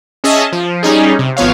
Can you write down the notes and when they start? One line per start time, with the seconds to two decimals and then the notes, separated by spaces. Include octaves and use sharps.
0.24 C#4 G#4 D#5 E5 A5
0.52 F3
0.83 G3 C#4 D#4 G#4
1.19 C3
1.36 G#1 F3 B3 C#5 F5